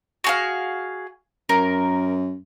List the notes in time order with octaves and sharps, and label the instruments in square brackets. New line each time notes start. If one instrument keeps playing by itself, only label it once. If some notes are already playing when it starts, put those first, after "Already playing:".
[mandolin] F#4 G#4 F5
[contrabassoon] F#2 [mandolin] A#4